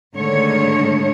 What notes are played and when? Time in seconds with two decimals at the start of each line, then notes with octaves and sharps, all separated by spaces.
0.14 G#2 D3 D#3 G#3 A3 C#5